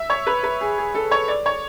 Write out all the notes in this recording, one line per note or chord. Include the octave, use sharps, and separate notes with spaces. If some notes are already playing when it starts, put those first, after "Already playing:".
Already playing: E5
C#5
B4
B4
G#4
G#4
A4
C#5
D5
C#5